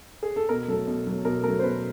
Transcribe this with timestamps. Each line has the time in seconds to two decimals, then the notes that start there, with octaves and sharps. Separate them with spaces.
0.23 G#4
0.36 A4
0.49 B2 A#4
0.68 F#3 A3 A4
0.87 B2
1.07 F#3 A3
1.25 B2 A#4
1.44 F#3 A3 A#4
1.59 C5
1.63 B2 B4